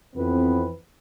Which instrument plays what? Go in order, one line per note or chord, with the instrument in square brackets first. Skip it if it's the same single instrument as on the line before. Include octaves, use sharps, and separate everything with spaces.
[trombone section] F2 E3 B3 C4 B4